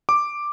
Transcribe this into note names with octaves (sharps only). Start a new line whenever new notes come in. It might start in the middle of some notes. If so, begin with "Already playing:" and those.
D6